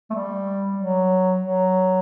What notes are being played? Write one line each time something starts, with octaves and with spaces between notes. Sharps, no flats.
A3
G3
F#3
F#3